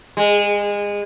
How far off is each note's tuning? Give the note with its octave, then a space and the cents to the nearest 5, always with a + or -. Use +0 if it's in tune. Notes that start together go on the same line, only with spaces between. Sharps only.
G#3 -25